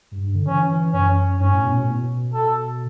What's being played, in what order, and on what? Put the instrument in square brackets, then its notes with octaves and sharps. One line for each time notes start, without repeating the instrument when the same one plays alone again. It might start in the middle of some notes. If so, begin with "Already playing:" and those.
[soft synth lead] G2
G2
D3
[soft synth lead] E3 [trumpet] C#4
[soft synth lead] E3
[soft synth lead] F#2 [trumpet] C#4
[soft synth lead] G2 [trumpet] C#4
[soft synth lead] A2
B2
A2
B2
[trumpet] A4